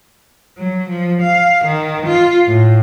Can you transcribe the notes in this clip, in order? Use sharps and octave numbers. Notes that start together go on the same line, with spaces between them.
F#3
F3
F5
D#3
F4
A2